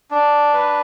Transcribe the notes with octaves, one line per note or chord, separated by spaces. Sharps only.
D4
B4